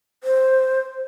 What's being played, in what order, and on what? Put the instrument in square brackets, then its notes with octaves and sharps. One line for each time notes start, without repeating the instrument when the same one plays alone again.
[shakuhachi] C5